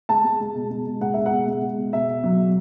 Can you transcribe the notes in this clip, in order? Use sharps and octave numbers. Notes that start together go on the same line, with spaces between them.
G#3 A5
G#3
G#3
B2
G#3
B2
G#3 F#5
G#3 E5
F#5
B2
G#3
G#3
B2
B2 E5
B2
F#3
B2